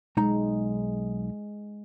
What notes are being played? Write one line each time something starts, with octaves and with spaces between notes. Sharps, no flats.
B1 G#3 D#4 A#5